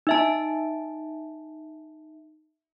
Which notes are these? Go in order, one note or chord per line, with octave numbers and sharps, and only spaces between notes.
D#4 E5 A5